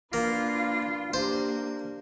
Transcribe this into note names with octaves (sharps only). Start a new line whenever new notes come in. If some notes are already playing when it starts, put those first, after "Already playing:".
A#3 D4 F4 B4
A#3 D4 G4 C5